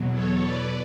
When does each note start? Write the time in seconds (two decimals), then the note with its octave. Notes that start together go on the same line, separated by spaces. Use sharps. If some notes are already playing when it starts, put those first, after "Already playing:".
Already playing: E2 B2 F#3
0.13 A4 C#5
0.42 B4 D5